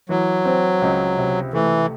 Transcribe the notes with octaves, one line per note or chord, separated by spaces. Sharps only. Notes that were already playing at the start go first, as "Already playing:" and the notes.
E3 F#3
C4
C#2
C3
E3 A3